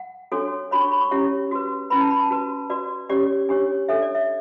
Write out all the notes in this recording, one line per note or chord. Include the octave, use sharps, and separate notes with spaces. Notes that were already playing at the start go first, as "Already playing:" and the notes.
Already playing: F#5
D4 F#4 A4 C#5
D4 F#4 C#5 B5
C#6
B5
C#6
C#4 E4 G4 C#5
F#4 B4
C#4 E4 B4 B5
A5
B5
A5
F#4 B4
F#4 B4 D5
C#4 G4 C#5 D5
D4 G4 C#5
D4 A4 C#5 E5
D5
E5